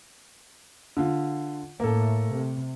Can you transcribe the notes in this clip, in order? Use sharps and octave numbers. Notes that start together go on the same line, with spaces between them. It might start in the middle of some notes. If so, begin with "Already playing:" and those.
D3 F4
A2 A3 A#3 A4
C3